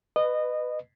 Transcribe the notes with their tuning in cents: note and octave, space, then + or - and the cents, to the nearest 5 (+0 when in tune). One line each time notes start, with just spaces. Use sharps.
B4 +10 D#5 -20